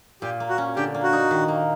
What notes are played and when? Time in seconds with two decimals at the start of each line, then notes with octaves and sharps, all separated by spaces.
0.22 A#2 G4
0.40 A#3
0.49 F#4
0.58 C#4
0.76 D3 G4
0.94 A#3
1.03 F#4
1.13 D#4
1.31 D#3
1.48 A#3